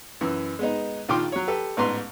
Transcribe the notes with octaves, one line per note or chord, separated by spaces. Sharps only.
F#2 E3
G#3 B3 D#4
A#1 D#3 F4 G5 C6 D6
F#3 C#5
G4 A4 B4
A1 G#2 B3 B4 A#5 C6